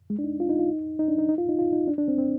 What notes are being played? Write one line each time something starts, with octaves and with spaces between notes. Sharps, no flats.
G#3
D4
D#4
F4
D#4
F4
D#4
D#4
D4
D#4
D#4
F4
D#4
F4
D#4
D4
D4
C4
C4